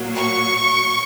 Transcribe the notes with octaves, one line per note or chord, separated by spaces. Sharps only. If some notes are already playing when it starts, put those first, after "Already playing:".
Already playing: A#2 F#3 A#3
C#6